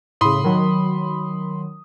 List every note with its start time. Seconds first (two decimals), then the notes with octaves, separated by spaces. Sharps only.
0.21 A2 C#3 B5 C6 D#6
0.44 D#3 F#3